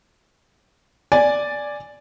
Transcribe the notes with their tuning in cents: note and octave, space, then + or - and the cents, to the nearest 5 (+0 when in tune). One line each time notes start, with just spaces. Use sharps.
D5 +0 G#5 +0